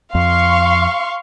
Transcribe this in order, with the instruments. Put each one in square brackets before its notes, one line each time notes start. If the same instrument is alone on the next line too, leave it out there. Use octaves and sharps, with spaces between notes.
[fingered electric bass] F2 [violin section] F5 C6 C#6